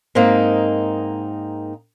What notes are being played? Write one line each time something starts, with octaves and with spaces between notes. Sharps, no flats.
G#2 A#3 C4 D#4